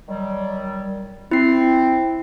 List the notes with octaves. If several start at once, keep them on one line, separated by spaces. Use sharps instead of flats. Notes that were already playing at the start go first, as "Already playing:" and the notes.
D#3 F#3 G3
C4 E4 C7